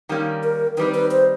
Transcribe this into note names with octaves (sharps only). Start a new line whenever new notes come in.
D#3 G3 A#3 C#4
A#4
D#3 G3 C4 D#4 B4
B4
C5